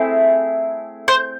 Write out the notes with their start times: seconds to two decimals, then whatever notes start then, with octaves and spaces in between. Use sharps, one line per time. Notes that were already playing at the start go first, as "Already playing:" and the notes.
Already playing: A3 C4 E4 G#4
1.08 C5